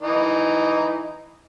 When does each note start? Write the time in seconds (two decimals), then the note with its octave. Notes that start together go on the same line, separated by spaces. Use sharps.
0.01 E3 D#4